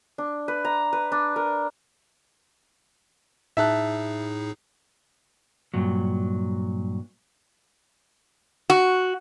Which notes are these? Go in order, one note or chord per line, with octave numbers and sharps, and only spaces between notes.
D4
B4
A#5
B4
D4
A#4
A2 D#4 G#4 E5 A5 F#6
G2 A#2 F#3
F#4